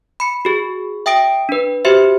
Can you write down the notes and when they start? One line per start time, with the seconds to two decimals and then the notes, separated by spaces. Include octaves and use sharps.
0.20 B5 C#7
0.45 F#4 G#4
1.06 E5 G5 D#6 A#6 D7
1.49 D4 B4
1.85 F#4 G4 C5 E5